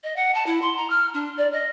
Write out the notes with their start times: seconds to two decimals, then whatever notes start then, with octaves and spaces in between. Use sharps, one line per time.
0.03 D#5
0.16 F#5
0.34 A5
0.46 E4
0.62 C6
0.76 A#5
0.90 F6
1.14 D4
1.37 D5
1.53 D#5